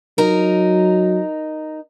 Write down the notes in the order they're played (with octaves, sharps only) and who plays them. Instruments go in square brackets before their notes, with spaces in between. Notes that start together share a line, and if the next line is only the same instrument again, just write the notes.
[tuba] F#3 [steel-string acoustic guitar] D#4 A#4